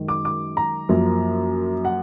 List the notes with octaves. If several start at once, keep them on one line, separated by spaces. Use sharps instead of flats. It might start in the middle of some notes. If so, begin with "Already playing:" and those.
Already playing: F#2 D#3 G#3
D6
D6
A#5
F#2 F3 A#3
F#5